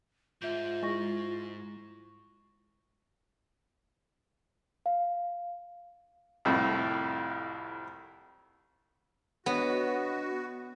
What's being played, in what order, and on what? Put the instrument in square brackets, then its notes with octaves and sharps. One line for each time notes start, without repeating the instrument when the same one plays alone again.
[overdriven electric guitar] G#2 [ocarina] F4 [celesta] E5 G6
[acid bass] G#3 [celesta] E4 C#6 A#6
[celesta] F5
[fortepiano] C2 F2 A2
[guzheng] B3 [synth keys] D4 C#5 D#5 [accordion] F#4